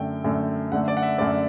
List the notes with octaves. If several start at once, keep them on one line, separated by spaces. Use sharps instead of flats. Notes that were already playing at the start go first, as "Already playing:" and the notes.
Already playing: F#2 D3 A3 G5
F#2 D3 A3
F#2 D3 A3 F#5
D5
F#5
E5
F#2 D3 A3 D5